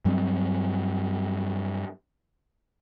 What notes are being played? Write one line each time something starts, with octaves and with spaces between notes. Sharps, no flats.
G2 F#3 G3 C4